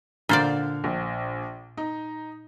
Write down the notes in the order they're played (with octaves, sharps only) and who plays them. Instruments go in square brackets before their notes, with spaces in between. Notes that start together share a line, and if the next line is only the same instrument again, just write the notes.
[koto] A#2 C5 D5 [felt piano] D3 F6
[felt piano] A#1
D#4